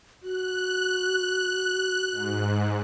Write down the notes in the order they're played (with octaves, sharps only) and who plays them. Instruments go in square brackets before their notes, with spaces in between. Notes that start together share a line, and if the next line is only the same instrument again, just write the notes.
[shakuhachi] F#4 [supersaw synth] F#6
[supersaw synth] G#2